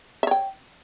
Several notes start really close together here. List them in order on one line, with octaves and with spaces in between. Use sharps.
E5 C#5 G5